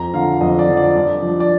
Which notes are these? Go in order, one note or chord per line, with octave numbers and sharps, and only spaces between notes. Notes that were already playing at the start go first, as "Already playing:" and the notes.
Already playing: F2 A#5
D3 F3 F5
F2 D#5
D5
D3 F3
D5
G2
F3
D5